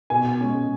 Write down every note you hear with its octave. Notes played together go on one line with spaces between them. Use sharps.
B2 G#5
G#3 C#4